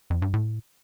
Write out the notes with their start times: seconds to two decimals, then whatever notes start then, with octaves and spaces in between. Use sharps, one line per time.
0.10 F2
0.22 G2
0.34 A2